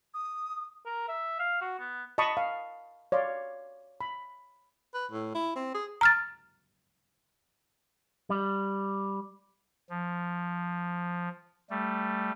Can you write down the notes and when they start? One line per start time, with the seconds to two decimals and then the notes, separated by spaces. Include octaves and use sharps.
0.14 D#6
0.86 A#4
1.09 E5
1.39 F5
1.61 F#4
1.79 B3
2.18 D#5 A5 B5 C#6 D#6
2.37 F5
3.12 C#5 D5 F5 C6
4.01 B5
4.95 B4
5.12 A2
5.35 E4
5.56 C4
5.75 G#4
6.01 A#5 F6 A6
8.30 G3
9.90 F3
11.70 G3 A3